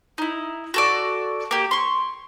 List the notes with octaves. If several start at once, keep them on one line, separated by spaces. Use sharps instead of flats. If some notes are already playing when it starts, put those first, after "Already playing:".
D#4 E4
F#4 A4 D5
A#3 G4
C6 C#6